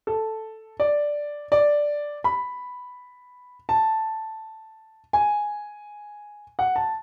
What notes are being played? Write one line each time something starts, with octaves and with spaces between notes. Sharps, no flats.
A4
D5
D5
B5
A5
G#5
F#5
A5